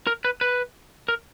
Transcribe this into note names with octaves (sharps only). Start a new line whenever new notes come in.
A#4
B4
B4
A#4